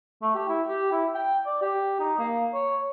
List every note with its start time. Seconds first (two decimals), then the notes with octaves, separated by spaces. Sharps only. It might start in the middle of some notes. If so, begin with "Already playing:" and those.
0.22 A3
0.35 G4
0.49 E4
0.67 G4
0.92 E4
1.15 G5
1.46 D5
1.62 G4
2.00 D#4
2.19 A#3
2.53 C#5